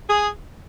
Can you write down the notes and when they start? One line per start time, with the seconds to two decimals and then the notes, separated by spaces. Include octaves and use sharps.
0.10 G#4